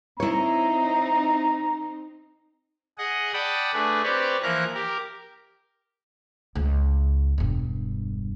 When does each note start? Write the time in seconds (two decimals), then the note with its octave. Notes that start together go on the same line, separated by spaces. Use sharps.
0.20 C4 D#4 E4 C#5 A#5
2.98 G#4 D#5 F#5
3.33 D5 F#5 G5 A5 B5 D#6
3.73 A3 D4 G#4 B4
4.03 C4 G4 B4 C#5 D5
4.43 E3 F3 A#3 A#4 A#5 F#6
4.74 G4 A#4
6.55 C#2
7.38 E1 G2